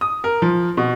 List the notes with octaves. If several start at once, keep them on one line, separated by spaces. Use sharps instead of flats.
D#6
A#4
F3
B2